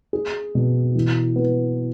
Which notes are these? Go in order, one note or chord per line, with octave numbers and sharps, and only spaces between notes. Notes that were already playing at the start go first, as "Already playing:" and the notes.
G#4
B2
E3
B3